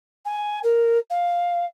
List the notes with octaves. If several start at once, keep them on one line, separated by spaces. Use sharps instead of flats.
G#5
A#4
F5